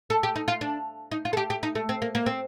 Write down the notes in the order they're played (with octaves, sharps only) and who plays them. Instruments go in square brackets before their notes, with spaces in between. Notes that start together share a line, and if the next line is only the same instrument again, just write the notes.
[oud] A4
G4
D#4
F4
D4
D#4
F4
A4
G4
G4
D#4
A3
C4
A#3
A#3
C4